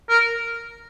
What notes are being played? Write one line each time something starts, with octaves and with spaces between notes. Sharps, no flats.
A#4